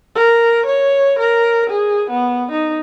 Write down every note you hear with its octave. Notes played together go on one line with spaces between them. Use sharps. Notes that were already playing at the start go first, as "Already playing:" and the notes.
A#4
C#5
A#4
G#4
B3
D#4